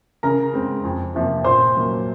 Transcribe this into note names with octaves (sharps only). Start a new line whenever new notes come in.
C#3 A#4 A#5
G#3 C4
F2
C3 F3 A#3
A#2 C5 C6
F#3 A#3